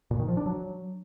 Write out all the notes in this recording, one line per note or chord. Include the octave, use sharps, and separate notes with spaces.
A#2
D#3
F3
D4
F#3